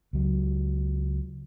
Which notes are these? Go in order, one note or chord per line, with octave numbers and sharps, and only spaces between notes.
C#2 F#3